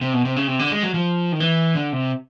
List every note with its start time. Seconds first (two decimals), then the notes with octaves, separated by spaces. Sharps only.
0.01 C3
0.13 B2
0.25 C3
0.36 C#3
0.48 C3
0.59 D3
0.71 G#3
0.83 F#3
0.94 F3
1.32 D#3
1.40 E3
1.75 D3
1.92 C3